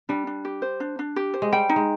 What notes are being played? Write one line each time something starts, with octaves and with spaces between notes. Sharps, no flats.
G3 D4
D4
G4
C5
D4
D4
G4
C5
G#3
G3 G5
D#4
G#3